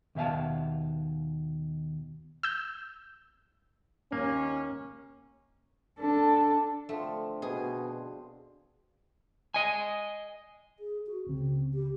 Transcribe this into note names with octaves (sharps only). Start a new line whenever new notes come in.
D#2 B2 E5 F5 A5
E6 G6
D#2 A#3 C#4
D4 A4
D3 F3 A3 C4
B2 G#4
D#5 G#5
G#4
F#4
C#2 C#3 C4
G4